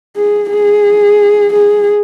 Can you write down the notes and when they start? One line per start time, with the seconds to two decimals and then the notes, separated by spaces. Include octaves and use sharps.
0.16 G#4
0.50 G#4
1.53 G#4